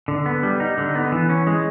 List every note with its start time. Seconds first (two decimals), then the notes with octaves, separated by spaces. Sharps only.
0.08 D3
0.26 B3
0.43 G3
0.60 D#4
0.78 D3
0.95 B3
1.12 E3
1.29 C#4
1.47 G#3